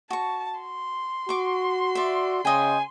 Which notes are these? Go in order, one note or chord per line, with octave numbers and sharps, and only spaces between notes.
F#4 A5 C#6
C6
F#4 C#6 D6
D5 E5
C#3 D#5 G5 G#5